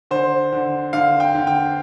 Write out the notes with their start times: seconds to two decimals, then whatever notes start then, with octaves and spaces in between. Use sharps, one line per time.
0.11 D3 C5
0.52 D3
0.93 D3 F5
1.20 G5
1.35 D3
1.47 G5